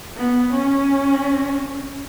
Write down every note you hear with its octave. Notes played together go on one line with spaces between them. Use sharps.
B3
C#4